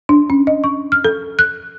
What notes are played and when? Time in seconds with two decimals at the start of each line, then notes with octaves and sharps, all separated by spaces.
0.09 D4
0.30 C#4
0.47 D#5
0.64 C#6
0.92 F6
1.05 A4
1.39 F#6